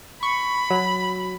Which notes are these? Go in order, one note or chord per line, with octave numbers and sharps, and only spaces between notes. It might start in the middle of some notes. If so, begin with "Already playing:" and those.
B5 C#6
F#3